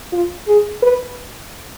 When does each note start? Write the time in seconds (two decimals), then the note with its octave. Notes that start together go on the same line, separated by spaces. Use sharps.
0.13 F4
0.48 G#4
0.83 B4